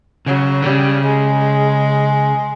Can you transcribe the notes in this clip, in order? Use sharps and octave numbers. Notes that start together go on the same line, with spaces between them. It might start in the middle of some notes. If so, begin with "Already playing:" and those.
C#3 F#3
D3
C#3 G3
G#3